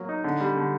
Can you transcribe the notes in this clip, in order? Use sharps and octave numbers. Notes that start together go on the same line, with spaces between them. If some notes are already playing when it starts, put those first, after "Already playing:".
Already playing: F#3 A#3
D#4
D3
G3
D3